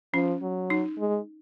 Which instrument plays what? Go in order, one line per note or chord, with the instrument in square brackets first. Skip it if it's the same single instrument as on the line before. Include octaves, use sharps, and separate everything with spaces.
[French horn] F3 [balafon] C#4
[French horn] F#3
[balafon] D#4
[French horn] G#3